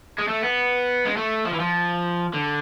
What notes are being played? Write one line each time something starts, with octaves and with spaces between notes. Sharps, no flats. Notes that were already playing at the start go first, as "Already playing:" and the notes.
G#3
A3
B3
G#3
A3
F3
E3
F3
D3